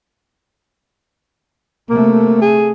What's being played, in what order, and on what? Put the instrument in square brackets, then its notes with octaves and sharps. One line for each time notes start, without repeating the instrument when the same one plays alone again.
[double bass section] C3 A3 [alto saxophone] A#3
[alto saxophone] G#4